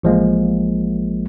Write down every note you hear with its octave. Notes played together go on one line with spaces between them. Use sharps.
A1 F3 G#3 A#3